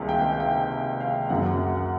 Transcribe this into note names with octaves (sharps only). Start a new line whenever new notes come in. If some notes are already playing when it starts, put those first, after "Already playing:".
Already playing: C#2 C3 D#3 G3 A#3 F5
G5
G5
F5
F#2 C#3 F#3 F#5
F#5